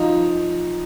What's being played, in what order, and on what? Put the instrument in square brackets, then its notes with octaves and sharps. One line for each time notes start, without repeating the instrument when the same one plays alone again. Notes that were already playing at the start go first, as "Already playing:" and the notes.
Already playing: [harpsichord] F3 [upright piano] D#4